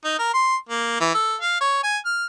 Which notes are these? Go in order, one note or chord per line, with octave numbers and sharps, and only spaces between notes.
D#4
A#4
C6
A#3
E3
A4
F5
C#5
G#5
F6